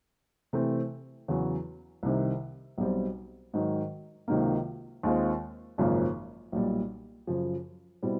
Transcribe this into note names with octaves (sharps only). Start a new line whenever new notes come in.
C3 E3 A3 C4
E2 C#3 F#3
C2 C3 D#3
B1 B2 G3 C4
G#2 D#3 F#3
C#2 C3 D#3 F#3 A#3
D#2 D#3 G#3 C4 F4
G#1 F#2 C#3 F3 A#3
B1 A#2 G3
F#2 C#3 F3
B2 G3 C4 E4